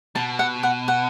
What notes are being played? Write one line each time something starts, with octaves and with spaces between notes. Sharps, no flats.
B2 A5
F#5
F#5
F#5